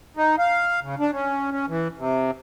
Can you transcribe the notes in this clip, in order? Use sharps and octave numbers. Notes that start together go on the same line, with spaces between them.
D#4
F5
C#3
D4
C#4
C#4
E3
C3